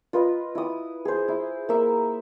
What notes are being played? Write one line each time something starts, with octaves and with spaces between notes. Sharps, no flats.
F4 B4 D#5
E4 D#6
G#4 C5
E4
A#3 E5